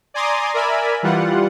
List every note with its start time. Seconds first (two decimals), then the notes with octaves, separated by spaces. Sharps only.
0.14 D5 G#5 A#5 C6 D6 D#6
0.54 A#4 D5 E5 G#5 B5
1.03 E3 G3 F4 F#5